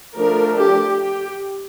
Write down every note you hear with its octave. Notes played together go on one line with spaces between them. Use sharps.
F3 A3 D4 A#4
G4
G4